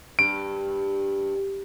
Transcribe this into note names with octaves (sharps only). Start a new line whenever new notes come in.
G2 D7